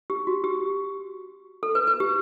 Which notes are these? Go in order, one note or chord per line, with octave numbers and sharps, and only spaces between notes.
G4
F#4
G4
A4
B4
B4
G4